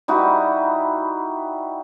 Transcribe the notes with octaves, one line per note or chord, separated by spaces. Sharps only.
G3 D#4 E4 F#4